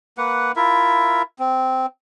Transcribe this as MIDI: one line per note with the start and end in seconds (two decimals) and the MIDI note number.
0.18 0.52 58
0.18 0.52 71
0.18 0.52 78
0.56 1.22 64
0.56 1.22 65
0.56 1.22 70
0.56 1.22 76
1.39 1.86 60